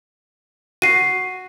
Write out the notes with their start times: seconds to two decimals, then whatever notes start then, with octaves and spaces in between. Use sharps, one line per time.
0.82 F#4 C7 D#7